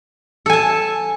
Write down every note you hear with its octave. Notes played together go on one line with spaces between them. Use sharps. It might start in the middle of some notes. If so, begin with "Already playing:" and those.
A4 G#5 A5